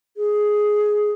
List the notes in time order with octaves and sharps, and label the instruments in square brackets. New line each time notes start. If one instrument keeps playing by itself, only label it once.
[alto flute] G#4